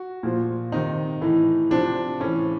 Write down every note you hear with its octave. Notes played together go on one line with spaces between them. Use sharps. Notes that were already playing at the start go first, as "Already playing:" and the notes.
Already playing: F#4
A#2 F3
C3 D#3 D#4
A2 E3
C3 F3 D4
A2 E3 C#4